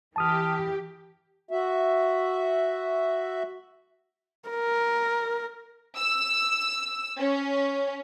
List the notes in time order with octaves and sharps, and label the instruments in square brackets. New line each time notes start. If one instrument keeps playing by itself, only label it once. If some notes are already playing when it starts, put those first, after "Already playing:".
[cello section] E3 G4 [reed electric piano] A5 D#6 F6
[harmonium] F#4 E5
[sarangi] A#4
[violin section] E6
C#4